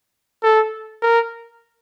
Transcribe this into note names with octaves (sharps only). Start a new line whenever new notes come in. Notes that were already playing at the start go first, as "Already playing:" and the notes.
A4
A#4